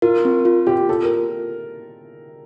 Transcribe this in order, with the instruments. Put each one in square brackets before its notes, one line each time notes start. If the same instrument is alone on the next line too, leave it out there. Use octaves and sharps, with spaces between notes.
[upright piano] F4 [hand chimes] A#4
[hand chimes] C4
F4
[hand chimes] F4 [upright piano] G4
[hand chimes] F4 [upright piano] A4
[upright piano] A#4